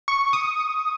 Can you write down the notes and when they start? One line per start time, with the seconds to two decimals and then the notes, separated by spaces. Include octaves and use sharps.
0.08 C#6
0.33 D#6